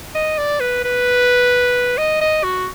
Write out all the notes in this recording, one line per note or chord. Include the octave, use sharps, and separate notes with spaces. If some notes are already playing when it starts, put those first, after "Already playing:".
D#5
D5
B4
B4
D#5
D#5
F#4